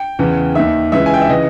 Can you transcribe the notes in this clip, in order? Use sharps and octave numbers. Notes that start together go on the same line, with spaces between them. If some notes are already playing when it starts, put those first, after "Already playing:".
Already playing: G5
E2 C#3 E3
D#2 D#3 E5
C#2 C#3 E3 E5
G#5
G5
E5
C#3 E3 D#5